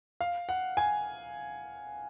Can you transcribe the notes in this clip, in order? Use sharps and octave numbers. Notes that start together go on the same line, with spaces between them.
F5
F#5
G#5